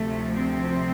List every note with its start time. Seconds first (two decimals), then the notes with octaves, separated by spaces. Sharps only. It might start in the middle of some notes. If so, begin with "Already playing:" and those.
Already playing: D2 C3 F3 A3
0.38 C4